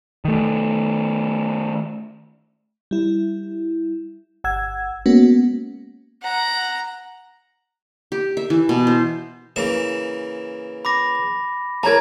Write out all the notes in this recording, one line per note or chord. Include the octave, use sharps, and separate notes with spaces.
D#3 A3
G3 E4
G1 F#5 E6 G#6
G#3 A#3 B3 C#4 F#4
F#5 A#5
G4
E5
E3
B2
C5
C#3 E3 A#3 E7
B5 D6 A#6
E3 A#4 C#5 A5 A#5 G#6